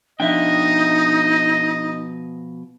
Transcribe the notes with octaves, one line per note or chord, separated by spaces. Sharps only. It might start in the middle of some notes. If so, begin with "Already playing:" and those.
B2 F3 D4 D#4 D#5 E5 G5